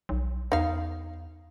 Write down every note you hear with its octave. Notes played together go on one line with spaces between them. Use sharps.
B1
E2 D#4 F5